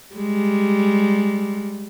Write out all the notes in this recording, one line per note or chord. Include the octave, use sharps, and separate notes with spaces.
G3 G#3